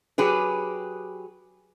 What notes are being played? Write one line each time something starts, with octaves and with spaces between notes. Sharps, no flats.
F#3 G4 G#4 B4